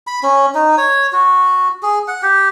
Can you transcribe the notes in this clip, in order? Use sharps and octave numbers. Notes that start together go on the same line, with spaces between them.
B5
C#4
D#4
C#5
F#4
G#4
F#5
G4